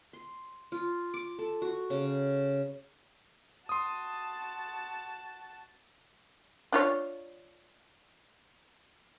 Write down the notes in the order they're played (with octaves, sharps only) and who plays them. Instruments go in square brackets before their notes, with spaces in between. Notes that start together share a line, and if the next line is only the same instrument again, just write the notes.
[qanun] C6
F4
D6
A4
F#4
C#3
[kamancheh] F#4 A5 [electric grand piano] C6 D#6
[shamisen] D4 F4 C#5